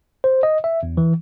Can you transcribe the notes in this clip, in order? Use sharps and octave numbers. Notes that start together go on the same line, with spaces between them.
C5
D#5
E5
E2
E3